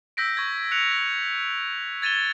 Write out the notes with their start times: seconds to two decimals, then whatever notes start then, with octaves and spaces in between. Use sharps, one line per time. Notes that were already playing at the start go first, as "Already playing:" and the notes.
0.17 E6 G6 A#6 B6 D7
0.37 C#6 G#6
0.71 F#6 C#7 F7
0.92 A#6
2.02 G#6 A6 D#7 E7 G7